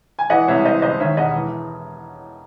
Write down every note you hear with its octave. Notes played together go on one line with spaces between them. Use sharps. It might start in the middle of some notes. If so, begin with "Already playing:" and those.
G#5
E3 D#5 F#5
C2 C#5 E5
E3 C5 D#5
C#2 C5 D#5
D#3 C#5 E5
E1 D#5 F#5
E3